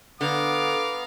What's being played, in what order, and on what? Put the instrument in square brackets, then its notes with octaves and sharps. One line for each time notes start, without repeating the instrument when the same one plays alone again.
[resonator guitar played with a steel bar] D3 [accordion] B3 [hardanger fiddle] F5 A#5 [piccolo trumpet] D6